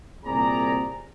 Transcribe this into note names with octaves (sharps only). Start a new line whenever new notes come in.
C2 A#2 C4 G#4 D5 A#5